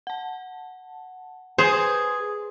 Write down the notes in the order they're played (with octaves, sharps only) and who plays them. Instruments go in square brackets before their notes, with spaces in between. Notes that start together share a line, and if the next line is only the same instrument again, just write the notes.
[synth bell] F#5 A5
[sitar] G#4 [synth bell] B4 G#5 C6 [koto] C5